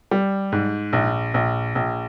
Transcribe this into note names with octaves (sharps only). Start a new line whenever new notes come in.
G3
G#2
A#1
A#1
A#1